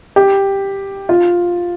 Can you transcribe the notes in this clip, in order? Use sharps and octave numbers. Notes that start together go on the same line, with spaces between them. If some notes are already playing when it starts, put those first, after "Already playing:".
G4
F4